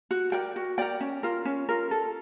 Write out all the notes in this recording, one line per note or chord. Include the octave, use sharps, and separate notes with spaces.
F#4
A#4 D5 G5
F#4
A#4 D5 G5
C#4
F4 A#4
C#4
F4 A#4
A4